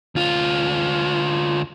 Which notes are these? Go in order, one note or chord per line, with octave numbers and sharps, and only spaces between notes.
D2 F4